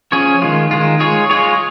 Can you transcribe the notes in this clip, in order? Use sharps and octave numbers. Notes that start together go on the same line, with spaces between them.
F3 C#4 G#4 C#5
D#3 G#3 F4
D#3 G#3 F4
G#3 F4 G#4 C#5
G#3 F4 G#4 C#5